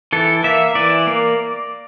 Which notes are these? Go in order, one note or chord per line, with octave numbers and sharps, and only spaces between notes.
E3 A4
A#3 E5
E3 D5
A#3